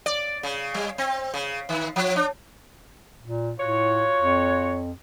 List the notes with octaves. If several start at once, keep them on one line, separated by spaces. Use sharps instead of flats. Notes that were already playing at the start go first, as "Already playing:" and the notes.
D5
C#3
G3
C4
C#3
D#3
F3
D4
A#2
A2 F4 F#4 C#5
F2